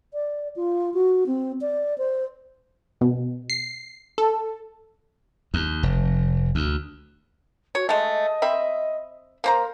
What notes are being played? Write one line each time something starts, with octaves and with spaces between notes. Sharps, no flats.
D5
F4
F#4
C4
D5
C5
B2
C7
A4
D#2
F1
D2
F#4 C#5
G#3 A3 D#5
C4 E5 B5
A#3 A#4 C5 A#5